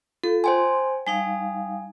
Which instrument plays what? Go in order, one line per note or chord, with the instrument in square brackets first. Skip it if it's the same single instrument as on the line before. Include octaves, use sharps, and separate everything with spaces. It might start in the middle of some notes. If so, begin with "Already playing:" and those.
[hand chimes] F4 [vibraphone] A4
[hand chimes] C5 G5 G#5 [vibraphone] C6
[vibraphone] G3 D#4 F5 [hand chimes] G#5